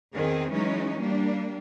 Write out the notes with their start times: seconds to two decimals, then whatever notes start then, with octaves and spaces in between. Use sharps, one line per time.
0.14 E2 D#3 C4 G#4
0.52 E3 F#3 G#3 C#4 D#4
0.99 G3 A#3 D4